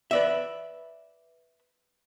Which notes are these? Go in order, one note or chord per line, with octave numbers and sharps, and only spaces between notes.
B4 D5 E5